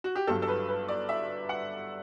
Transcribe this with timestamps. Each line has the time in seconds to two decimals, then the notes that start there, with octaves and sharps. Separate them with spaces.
0.04 F#4
0.15 G4
0.27 G1 G2 F#3 A4
0.42 A4
0.48 B4
0.68 B4
0.88 D5
1.09 E5
1.49 F#5